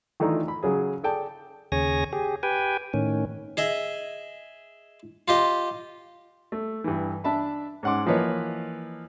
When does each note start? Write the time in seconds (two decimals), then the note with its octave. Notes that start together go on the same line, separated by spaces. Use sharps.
0.20 D#3 E3 A3 D4 D#4 F4
0.48 B5
0.63 C#3 F#3 G#4
1.03 G#4 A4 D5 G5 A5
1.72 D#2 C#3 G#4 C#5 G#5 A#6
2.13 G4 G#4
2.43 G4 B4 G5 G#5
2.94 A2 D#3 C#4
3.57 G#4 D#5 E5
5.28 F4 G4 D#5
6.52 A3
6.84 G2 E3
7.24 D4 E5 A5 B5
7.83 G#2 C#4 F#5 C6 D6
8.06 E3 F3 A#3 B4 C#5 D#5